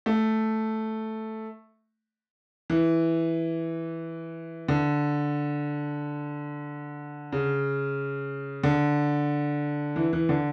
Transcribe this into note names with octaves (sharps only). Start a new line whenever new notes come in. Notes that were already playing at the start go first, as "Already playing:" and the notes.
A3
E3
D3
C#3
D3
E3
E3
D3